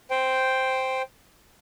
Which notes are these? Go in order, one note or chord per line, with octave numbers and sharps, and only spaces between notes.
C5 G5